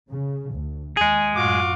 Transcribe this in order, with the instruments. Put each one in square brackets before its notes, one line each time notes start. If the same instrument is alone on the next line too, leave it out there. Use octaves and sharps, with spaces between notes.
[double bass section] C#3
D2
[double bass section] D#2 [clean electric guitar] G#3 G#4
[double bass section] F#2 A2 [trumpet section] F4 F#4 D6